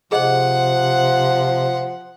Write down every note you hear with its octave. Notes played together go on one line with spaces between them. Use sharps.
C3 F3 G#4 D#5 F#5